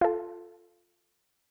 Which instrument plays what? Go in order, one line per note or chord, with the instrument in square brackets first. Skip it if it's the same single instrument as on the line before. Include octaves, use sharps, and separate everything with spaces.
[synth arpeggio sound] F4 A4